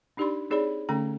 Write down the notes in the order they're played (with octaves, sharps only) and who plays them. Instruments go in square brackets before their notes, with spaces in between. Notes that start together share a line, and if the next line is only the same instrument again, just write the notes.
[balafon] D4 D#4 G4 D5 B5 C6
C4 D#4 G#4 C#5 D5 B5
D3 A3 C#4 G5 A#5